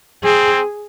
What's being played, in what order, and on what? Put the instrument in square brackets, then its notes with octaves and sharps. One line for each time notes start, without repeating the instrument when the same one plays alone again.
[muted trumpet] C4 [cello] G#4